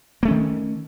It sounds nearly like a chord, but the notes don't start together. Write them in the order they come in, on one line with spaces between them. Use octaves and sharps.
A#3 A3 C#4 D#3